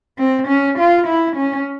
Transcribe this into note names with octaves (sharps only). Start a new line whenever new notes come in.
C4
C#4
F4
E4
C#4